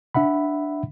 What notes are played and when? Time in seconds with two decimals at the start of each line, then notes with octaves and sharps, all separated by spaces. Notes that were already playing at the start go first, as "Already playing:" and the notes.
0.14 D4 E5 F#5 B5